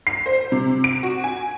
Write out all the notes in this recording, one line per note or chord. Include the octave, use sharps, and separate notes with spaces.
C7
C5
C3
D7
F#4
G#5